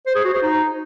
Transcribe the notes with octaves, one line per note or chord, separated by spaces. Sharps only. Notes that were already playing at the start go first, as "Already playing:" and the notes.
C5
G#4
F#4
C5
D#4